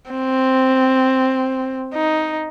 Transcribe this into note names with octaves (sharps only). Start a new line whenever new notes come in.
C4
D#4